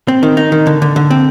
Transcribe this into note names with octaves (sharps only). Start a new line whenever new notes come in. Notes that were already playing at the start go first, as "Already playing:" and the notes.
C4
D#3
D#4
D#3
D3
D3
D3
C4